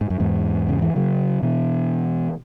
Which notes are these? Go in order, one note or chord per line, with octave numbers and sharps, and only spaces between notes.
G#2
F#2
E2 G#2
C#3
E3
C#3 F#3
B2 E3